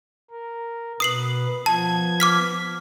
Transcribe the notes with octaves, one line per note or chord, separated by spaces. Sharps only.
A#4
B2 B4 D#6 C7 F#7
F3 B3 A5 G#6
D6 F6 B6